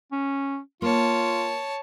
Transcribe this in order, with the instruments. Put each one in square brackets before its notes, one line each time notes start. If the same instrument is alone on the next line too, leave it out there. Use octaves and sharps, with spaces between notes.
[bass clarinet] C#4
[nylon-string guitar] A#3 [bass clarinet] F4 [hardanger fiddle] C#5 A5